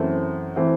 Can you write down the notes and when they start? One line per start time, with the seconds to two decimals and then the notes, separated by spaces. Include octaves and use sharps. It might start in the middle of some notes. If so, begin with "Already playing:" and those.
Already playing: F#2 E3 A3 C4
0.56 E3 A3 C4